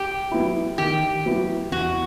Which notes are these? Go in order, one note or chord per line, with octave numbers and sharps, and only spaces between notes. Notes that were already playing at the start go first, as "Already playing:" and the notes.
Already playing: G4
F#3 B3 E4
D#3 G4
F#3 B3 E4
E2 F#4